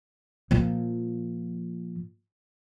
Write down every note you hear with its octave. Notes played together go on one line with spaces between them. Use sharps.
A#2 F3